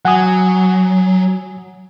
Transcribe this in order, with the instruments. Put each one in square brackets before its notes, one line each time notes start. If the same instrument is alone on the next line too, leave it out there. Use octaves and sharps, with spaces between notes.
[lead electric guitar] F#3 [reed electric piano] F#5 G#5 D#6